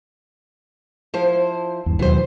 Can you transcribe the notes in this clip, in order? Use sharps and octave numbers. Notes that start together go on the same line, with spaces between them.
F3 E4 C5
E2 G2
D#2 B2 E3 F#3 C5